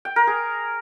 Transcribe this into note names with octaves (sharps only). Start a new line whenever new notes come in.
G5
A#4
G#4